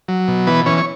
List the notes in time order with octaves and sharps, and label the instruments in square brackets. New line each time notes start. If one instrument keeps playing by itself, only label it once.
[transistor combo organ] F#3
B2
E3 B3 B4
E3 C#4 C#5
C#5